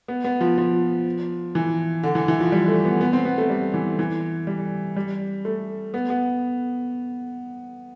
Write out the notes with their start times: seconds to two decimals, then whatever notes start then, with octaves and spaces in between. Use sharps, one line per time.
0.08 B3
0.24 B3
0.41 F3
0.58 F3
1.55 E3
2.03 D3
2.15 E3
2.28 E3
2.40 F3
2.52 G3
2.68 A3
2.85 B3
3.01 B3
3.13 C4
3.25 B3
3.38 A3
3.50 G3
3.74 E3
3.99 E3
4.47 G3
4.96 G3
5.45 A3
5.94 B3
6.10 B3